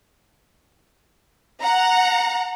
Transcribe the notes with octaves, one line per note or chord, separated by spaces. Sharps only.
F#5 A#5